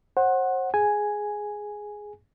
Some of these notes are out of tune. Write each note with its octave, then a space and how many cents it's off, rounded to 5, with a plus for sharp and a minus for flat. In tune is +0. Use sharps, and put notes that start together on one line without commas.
C5 +35 F#5 +0
G#4 +5 G#5 +0